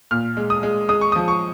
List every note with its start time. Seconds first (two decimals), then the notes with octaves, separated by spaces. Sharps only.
0.11 A#2 F6
0.37 G#3
0.50 D#6
0.63 G#3
0.89 G#3 D#6
1.01 C#6
1.12 F3 D#6
1.28 C#6